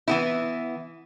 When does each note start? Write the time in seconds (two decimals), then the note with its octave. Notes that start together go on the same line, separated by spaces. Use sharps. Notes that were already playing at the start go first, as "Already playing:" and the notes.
0.08 E3 B3 E4